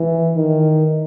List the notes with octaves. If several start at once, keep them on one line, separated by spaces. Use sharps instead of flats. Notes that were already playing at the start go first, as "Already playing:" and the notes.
Already playing: E3
D#3